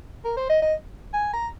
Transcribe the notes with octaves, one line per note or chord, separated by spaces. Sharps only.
A#4
C5
D#5
D#5
G#5
A#5